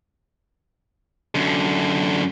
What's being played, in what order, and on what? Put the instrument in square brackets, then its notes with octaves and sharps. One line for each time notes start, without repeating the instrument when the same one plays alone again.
[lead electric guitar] F#2 D3